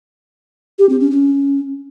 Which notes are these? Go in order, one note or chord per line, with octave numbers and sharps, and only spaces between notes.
G4
C4
C#4
C#4